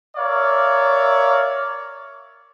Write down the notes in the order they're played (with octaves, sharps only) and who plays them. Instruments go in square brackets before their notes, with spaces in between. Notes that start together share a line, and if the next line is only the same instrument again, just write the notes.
[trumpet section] A#4 C#5 D5 E5 F5